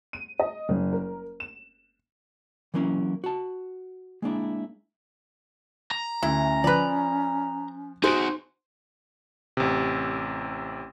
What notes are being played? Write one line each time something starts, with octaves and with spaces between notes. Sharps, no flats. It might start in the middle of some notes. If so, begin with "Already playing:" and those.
D#7
D#5
F#1
A#4
E7
E3 F#3 A#3 C#4 E4
F#4 A5
G#3 A#3 D4 E4
A#5
D2 C#4 E4
F3 B4 D5 F#6
D#4 F#4 G#4 C5 D7
A1 C3